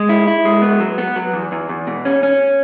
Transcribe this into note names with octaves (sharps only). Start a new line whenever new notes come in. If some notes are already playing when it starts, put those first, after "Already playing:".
Already playing: G#3
E4
E4
G#3
B3
F#3
B3
F#3
E2
E2
E2
B2
C#4
C#4